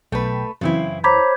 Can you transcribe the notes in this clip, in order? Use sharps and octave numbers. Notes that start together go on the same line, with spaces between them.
B1 A3 B4 G5
F#2 C#3 E3 C4 E4
C5 C#5 A#5 B5 D6 B6